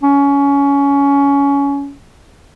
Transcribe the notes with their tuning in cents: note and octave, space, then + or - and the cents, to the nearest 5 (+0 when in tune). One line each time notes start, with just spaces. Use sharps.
C#4 +20